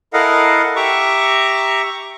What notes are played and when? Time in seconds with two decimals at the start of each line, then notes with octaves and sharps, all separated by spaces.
0.13 E4 A4 A#4 D#5 F5 F#5
0.76 G4 E5 A#5 C#6 D6